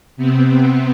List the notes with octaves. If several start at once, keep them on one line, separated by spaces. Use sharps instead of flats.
C3 B3 C4